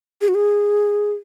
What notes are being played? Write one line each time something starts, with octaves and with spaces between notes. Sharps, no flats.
G#4
F#4
G#4